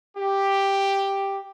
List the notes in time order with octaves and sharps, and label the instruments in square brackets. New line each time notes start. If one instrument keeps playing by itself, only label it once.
[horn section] G4